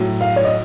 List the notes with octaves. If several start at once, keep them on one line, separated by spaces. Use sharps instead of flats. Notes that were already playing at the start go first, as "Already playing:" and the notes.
Already playing: A2 F#3
F5
C#5
D#5